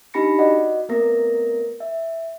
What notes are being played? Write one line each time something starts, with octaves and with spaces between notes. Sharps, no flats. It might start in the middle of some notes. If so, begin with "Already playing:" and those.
D4 D#4 G4 B5 A#6 C#7
F#4 D5 D#5 F#5
A3 B3 C4 A#4 A#6
E5